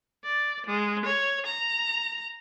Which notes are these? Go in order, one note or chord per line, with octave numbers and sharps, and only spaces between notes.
D5
G#3
C#5
A#5